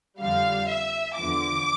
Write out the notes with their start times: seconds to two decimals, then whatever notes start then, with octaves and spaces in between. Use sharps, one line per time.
0.20 F2 D3 G3 F5
0.69 E5
1.17 E2 D3 F3 D6